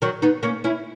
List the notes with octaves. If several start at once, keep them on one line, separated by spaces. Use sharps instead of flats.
D#3 F#3
B3 D#4
A#3 C#4
C#4 E4